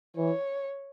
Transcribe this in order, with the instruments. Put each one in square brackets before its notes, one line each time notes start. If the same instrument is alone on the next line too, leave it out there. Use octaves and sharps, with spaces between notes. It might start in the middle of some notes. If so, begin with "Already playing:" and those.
[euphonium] E3 [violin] C#5